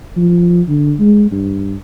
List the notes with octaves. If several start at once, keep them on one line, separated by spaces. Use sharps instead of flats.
F3
D3
G#3
G2